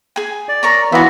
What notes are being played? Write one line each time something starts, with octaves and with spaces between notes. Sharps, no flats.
G#4 G#5
D5
A#4 C#5 A#5
E3 B3 F4 F#4 E5